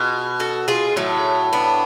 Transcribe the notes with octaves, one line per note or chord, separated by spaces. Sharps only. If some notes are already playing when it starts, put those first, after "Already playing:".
Already playing: B2 F4 G#4
F#4 A4
F4 G#4
A2 F#3 A3
B3 D4